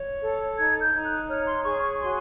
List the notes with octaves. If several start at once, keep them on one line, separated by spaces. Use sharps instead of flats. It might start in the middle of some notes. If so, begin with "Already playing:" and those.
Already playing: C#5
A4
D#4 G#6
G6
D#4
F#6
C#5 F6
C6
G#4 C#6
C#6
F#4 C6